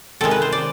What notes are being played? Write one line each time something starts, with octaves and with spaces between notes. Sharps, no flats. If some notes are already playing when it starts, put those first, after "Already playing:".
C3 D#3 G#3 A4
B4
C5
D5